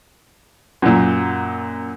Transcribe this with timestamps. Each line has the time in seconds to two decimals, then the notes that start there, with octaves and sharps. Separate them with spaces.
0.82 F#2 A#2